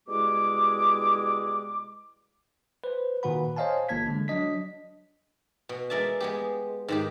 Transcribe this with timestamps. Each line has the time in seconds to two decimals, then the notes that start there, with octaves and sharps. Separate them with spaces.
0.08 B2 G3 G#3 E4 G#4 D6
2.84 B4 C5
3.23 A#2 D#3 F#4 B4 F#5 B5
3.56 C5 C#5 D#5 F5 G#5 A5
3.89 G1 E3 A#3 A5 G#6 B6
4.07 D3 G#3
4.28 F#3 D4 D#5 B6
5.69 B2
5.90 G#3 A#4 D5 E5 A5
6.20 G#3 B3 G4
6.88 G#2 D#3 G4